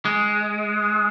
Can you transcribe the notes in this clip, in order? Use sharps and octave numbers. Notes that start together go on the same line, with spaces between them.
G#3